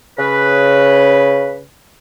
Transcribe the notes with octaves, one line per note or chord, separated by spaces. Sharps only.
C#3 B4